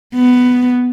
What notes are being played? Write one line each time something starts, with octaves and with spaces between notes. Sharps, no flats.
B3